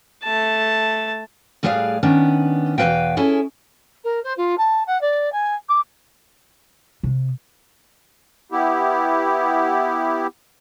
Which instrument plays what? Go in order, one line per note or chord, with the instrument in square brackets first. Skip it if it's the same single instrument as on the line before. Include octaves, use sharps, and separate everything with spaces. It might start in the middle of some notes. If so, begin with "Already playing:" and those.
[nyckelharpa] A3 A5
[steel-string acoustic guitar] A2 G3 G#4 B4 D5 F5
D#3 B3 C#4 D4
E2 B2 F3 B4 F5 G5
C#4 E4 G#4 A4
[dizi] A#4
C5
F4
A5
F#5
D5
G#5
D6
[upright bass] C3
[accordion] B3 E4 G4